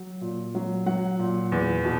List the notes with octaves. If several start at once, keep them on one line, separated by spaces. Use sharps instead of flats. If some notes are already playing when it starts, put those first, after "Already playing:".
Already playing: F#3
A#2
F#3
F#3 F#5
A#2
E2
B2